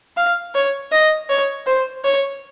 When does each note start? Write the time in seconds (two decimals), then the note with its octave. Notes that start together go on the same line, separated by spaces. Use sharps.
0.17 F5
0.55 C#5
0.92 D#5
1.29 C#5
1.67 C5
2.04 C#5